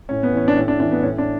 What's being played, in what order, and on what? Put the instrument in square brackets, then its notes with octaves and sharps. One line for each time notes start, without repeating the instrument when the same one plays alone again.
[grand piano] A2 C#4
B3
E3 C#4
D4
A2 C#4
D4
E3 D4
B3
A2 C#4
D4